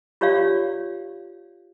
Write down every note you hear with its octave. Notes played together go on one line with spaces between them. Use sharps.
F4 G4 C#5 D5 F5